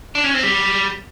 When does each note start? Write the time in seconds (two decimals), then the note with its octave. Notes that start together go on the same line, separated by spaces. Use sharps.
0.15 D4
0.24 C#4
0.34 C4
0.43 G3